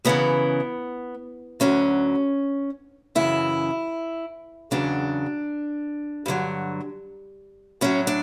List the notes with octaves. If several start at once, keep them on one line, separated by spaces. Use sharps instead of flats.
F#2 C#3 E3 B3
D2 D3 F#3 C#4
F#2 C#3 E3 E4
E2 C#3 F#3 D4
G2 D3 F#3
A2 F#3 C#4
D4